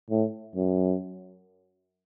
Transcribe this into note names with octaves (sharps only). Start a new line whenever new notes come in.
A2
F#2